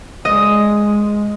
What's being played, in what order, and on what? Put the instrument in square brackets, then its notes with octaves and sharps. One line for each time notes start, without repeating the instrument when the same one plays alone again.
[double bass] G#3 [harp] D#5